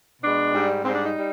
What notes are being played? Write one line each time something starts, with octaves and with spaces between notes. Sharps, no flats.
B2 G#3 D4
G#2 G3
G#2 G3 C4
D4
D#4
G3